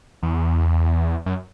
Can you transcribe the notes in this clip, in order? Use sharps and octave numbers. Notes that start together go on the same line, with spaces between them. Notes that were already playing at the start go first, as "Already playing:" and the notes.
E2
F#2